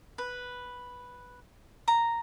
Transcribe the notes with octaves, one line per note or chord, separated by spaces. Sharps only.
B4
A#5